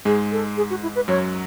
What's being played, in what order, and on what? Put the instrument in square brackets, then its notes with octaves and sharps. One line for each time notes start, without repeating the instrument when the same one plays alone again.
[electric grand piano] G#2 G#3 [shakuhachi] G#4
[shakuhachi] A4
G#4
F#4
E4
B4
[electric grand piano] F#2 F#3 [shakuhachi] C#5